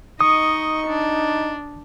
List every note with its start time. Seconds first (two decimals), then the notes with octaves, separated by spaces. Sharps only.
0.21 D#4 D#5 C#6 D#6
0.87 D4